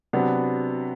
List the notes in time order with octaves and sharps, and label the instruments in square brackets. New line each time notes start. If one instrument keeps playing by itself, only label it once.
[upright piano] C3 F#3 B3 D4